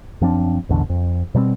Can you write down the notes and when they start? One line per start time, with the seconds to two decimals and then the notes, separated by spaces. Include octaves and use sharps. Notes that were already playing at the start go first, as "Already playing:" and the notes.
0.21 F#2 F3 C4 D4
0.69 A1 E2 B2 D3
0.90 F2
1.35 B2 G3 A3 C4